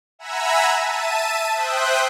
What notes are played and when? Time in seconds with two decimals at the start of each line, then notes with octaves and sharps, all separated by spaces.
0.19 E5 F#5 G#5 A#5 B5 E6
0.74 E5 A5 D#7
1.52 C5 E5 G5 D#6 F#6